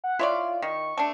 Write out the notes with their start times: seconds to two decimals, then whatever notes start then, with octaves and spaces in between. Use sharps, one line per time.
0.04 F#5
0.19 E4 F4 C#5 D5
0.62 D#3 C#6
0.97 A3 D4